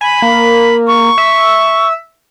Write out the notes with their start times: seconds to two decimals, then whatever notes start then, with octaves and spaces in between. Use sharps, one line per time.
0.01 G#5 B5
0.22 A#3
0.87 C#6
1.18 E5